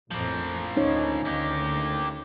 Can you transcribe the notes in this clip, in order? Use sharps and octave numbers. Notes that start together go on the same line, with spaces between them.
A1 F2 A2 F3 A#3
D2 C#4 D#4 C#5
D2 A#3 G4